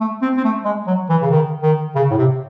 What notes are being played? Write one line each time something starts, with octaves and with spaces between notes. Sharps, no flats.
A3
C4
C4
A3
G#3
F#3
E3
C#3
D#3
D#3
C#3
A2
C3